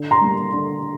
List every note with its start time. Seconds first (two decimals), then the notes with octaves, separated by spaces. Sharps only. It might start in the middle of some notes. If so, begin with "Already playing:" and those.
Already playing: D3
0.11 A#5 C6
0.21 G3 A#3
0.53 D3